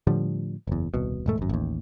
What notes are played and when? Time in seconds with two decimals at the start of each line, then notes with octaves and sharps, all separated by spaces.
0.07 A2 D3 F3 G3
0.67 F#1 E2
0.94 D#1 C2 B2
1.26 E1 G#2 A3
1.37 G#1 F#2
1.49 A1 D#2